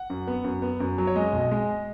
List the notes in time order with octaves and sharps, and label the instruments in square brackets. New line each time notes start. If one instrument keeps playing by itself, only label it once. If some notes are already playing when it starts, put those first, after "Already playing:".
Already playing: [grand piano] F#5
F#2
B3
F#2
B3
F#2
F#3
C#5
G#3 D#5
B1
G#3